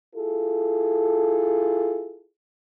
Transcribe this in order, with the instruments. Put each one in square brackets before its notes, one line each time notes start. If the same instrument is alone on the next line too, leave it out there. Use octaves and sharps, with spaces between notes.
[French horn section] E4 F4 G#4 A4